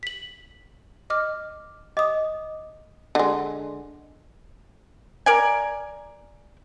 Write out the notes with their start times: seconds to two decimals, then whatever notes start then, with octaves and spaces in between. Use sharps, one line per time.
0.03 B6 F#7
1.10 D#5 D6 F6
1.97 D#5 D6 D#6
3.15 D3 G#3
5.26 A#4 D5 G#5